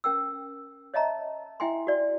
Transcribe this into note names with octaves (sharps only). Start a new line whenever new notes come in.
C#4 A#4 G5 E6
C#5 D#5 E5 A5 A#5
E4 E5 G5 G#5 C6
F#4 D5